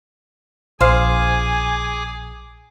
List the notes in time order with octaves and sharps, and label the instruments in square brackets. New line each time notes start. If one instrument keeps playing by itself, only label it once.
[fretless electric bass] A#1 [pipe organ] G#4 D6 [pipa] C5 F5 [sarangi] G#5